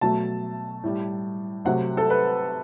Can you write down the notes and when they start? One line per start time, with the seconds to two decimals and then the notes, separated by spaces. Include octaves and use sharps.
0.01 B2 F#3 A3 A5
0.83 A2 G3
1.65 C3 F#3 A3 F#5
1.97 A4
2.10 B4